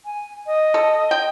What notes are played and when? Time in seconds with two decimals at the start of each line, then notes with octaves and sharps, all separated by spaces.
0.05 G#5
0.46 D#5
0.74 A4
1.11 G5